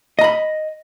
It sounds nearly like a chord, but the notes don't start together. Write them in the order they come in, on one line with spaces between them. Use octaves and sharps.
D#5 A#5 B5